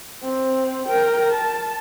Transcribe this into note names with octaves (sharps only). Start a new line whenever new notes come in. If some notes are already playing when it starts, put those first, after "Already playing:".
C4
A#4 G5
A5